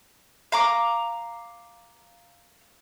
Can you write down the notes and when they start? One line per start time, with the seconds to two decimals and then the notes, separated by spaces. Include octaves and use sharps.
0.52 F5 A#5 D6